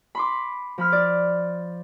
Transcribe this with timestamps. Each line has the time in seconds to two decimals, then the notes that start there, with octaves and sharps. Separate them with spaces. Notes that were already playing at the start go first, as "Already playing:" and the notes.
0.15 B5 C6 D6
0.78 F3 B5 F6
0.92 D5